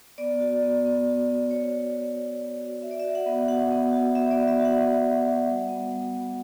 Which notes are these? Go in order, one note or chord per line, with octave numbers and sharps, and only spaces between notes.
B3 D5
F#4
B3
B3
F#4
B3
B3 C#5
F#4
F#4
B3
B3
F#4
F#4 E5
D5
F#4 E5
F#5
B3
F#4 F#5
B3
F#4
B3 E5
D5
B3
E5
F#4
F#5
B3
F#4
F#4
G3
B3
G3
B3